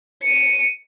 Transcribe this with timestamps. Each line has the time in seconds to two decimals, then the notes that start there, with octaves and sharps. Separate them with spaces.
0.23 C#7 D#7